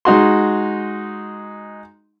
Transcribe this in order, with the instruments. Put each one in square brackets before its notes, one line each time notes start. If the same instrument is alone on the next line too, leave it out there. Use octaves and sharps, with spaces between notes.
[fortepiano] G#3 D#4 F#4 C6